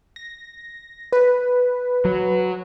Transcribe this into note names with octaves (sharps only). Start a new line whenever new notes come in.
A#6
B4
F#3